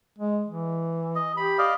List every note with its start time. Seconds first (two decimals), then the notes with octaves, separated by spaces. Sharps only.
0.19 G#3
0.47 E3
1.15 D#5
1.37 G4 B5
1.58 D5 D#5 F5